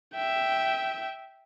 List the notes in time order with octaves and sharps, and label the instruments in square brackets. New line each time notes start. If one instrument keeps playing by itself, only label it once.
[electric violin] E5 G5